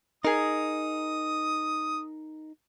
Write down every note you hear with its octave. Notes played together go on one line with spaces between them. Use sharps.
D#4 G#4 A#4 D#6